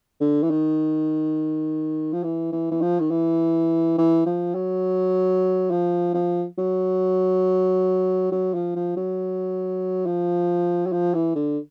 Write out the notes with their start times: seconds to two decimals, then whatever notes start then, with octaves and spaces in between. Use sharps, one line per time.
0.20 D3
0.43 E3
0.50 D#3
2.13 F3
2.24 E3
2.52 E3
2.71 E3
2.82 F3
3.00 D#3
3.10 E3
3.98 E3
4.26 F3
4.55 F#3
5.71 F3
6.14 F3
6.58 F#3
8.32 F#3
8.54 F3
8.76 F3
8.96 F#3
10.06 F3
10.86 F#3
10.92 F3
11.14 E3
11.35 D3